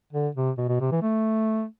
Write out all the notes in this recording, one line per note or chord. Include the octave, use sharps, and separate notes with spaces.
D3
C3
B2
B2
C3
E3
A3